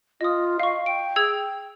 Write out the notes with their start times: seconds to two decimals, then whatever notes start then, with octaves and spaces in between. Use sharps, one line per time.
0.21 F4 D#5 D#6
0.60 D#5 F5 C#6
0.86 G5 D7
1.16 G#4 E6 G#6